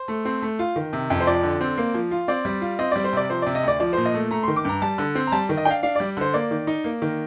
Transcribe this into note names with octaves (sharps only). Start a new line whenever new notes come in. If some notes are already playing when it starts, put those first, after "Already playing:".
Already playing: C5
A3
C4
A3
F4
D#3
C3
F2
C5
F3 D5
D3
C4
A#3
F3
F4
C4 D5
G3
F4
C4 D#5
G3 D5
C5
C3 D5
F3 C5
C3 D5
D#5
D2 D5
F3 D5
A#2 C5
D#5
A3
A3 A#5
D#3 C6
D6
G2 A#5
G3 A5
D3
C4
A#5
G3 A5
D#3
D#5
D4 F5 G5
D4 F5
G3 D5
D3 C5
A#3 D5
D#3
D#4
A#3
D#3